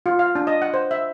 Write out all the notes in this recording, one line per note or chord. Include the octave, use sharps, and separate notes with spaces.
F4
F5
D4
D#5
F#5
C5
E5